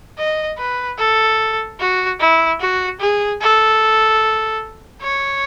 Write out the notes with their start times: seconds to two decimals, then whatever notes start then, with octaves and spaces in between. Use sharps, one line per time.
0.18 D#5
0.58 B4
0.99 A4
1.80 F#4
2.20 E4
2.60 F#4
3.00 G#4
3.41 A4
5.02 C#5